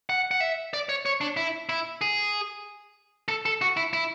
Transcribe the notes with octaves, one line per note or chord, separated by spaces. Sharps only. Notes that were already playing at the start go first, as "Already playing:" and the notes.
F#5
F#5
E5
D5
C#5
C#5
D4
E4
E4
G#4
A4
A4
F#4
E4
E4